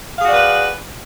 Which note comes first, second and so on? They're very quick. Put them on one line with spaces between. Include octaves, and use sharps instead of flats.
F5 G#4 F#4 D5 B4